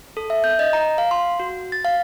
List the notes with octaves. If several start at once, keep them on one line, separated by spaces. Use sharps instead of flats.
A4
E5
G6
D#5
A#5
F5
C6
F#4
A6
F5